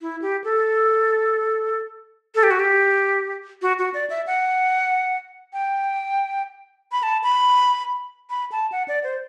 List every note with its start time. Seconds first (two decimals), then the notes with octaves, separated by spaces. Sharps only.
0.01 E4
0.22 G4
0.44 A4
2.35 A4
2.43 G4
2.51 F#4
2.60 G4
3.62 F#4
3.79 F#4
3.94 D5
4.10 E5
4.27 F#5
5.53 G5
6.92 B5
7.03 A5
7.24 B5
8.30 B5
8.52 A5
8.72 F#5
8.88 D5
9.04 C5